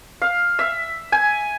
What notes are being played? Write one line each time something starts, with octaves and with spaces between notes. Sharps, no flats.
F5
E5
G#5